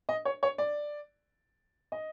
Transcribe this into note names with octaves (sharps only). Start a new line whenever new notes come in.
D#5
C#5
C#5
D5
D#5